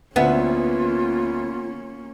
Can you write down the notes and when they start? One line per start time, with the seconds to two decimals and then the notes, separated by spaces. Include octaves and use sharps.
0.16 D2 A#3 B3 C#4 F4 E5 F#5